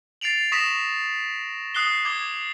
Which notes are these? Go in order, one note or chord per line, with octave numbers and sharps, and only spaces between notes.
A6 C7 D7 F7 F#7
C#6 D#6 A#6 B6 E7
D#6 F#6 C7 G7
D6 G#6 G7